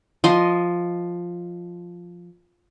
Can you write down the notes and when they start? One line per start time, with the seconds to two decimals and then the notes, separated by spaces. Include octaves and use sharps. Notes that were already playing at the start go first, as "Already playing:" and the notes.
0.24 F3 D#5 C6